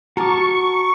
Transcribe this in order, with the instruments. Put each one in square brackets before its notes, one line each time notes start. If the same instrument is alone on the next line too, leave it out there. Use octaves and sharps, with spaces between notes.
[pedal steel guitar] F#4 D6 [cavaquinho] A#4 A5 [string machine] C#6